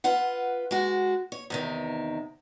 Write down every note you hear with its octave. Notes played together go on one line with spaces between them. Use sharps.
F4 B4 F#5
G#3 F#4
C#5
E2 C3 D#3